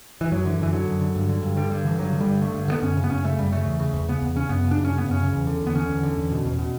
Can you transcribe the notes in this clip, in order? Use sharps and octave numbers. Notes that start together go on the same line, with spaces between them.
E3
F#2 F#3
D3 E3
F#2 E3
D3 F#3
F#2
D3
G2
D3
G2
D3 G3
G2
D3 E3
G2 F#3
D3
G3
G2
D3 A3
G2
D3 B3
F#2 C#4
C#3
B3
F#2 C#4
C#3 A3
F#2 G3
C#3 A3
E2
C#3
E2
C#3 B3
E2
C#3 C#4
F#2 B3
C#3
D4
F#2
C#4
C#3
B3
F#2
C#4
C#3
E2
D3
E2 B3
D3 C#4
E2
D3
E2
B2
E2
B2